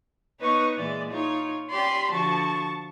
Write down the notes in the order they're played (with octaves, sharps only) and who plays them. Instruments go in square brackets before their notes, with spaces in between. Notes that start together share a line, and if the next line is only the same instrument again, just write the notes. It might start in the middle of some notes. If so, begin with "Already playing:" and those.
[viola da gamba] B3 D#4 C#5 [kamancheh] B4 C#6
[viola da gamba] A#2 E3 G#3 [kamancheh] D5
[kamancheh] D#4 [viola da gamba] F4 C#5
[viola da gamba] C#4 G4 D5 [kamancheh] B5 C6
[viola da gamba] D3 F3 F#4 [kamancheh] A5 C#6